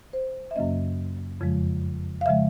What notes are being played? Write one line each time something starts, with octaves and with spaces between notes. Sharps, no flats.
C5
E5
F#2 C#3 F#3 A#3 C#4 D#5
F2 C#3 F3 G#3
F5
C#3 F3 G#3 E5